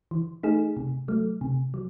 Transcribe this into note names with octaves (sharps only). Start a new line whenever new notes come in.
E3
A3 D#4 G#4
C3
F#3 A3
C3
F#3